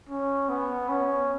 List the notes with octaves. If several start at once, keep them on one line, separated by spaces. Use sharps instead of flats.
C#4
B3
C#4